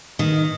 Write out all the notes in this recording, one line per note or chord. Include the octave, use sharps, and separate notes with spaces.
D#3